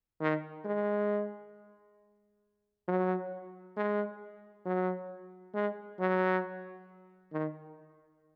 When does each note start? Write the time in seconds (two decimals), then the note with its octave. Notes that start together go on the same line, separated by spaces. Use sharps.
0.21 D#3
0.65 G#3
2.88 F#3
3.77 G#3
4.66 F#3
5.54 G#3
6.00 F#3
7.33 D#3